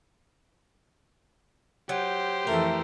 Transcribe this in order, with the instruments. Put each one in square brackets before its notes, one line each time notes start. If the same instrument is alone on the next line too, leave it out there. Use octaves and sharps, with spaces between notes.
[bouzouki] F#3 [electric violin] G4 C5
[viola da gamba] F2 E3 A4 [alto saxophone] A3 [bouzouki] A#4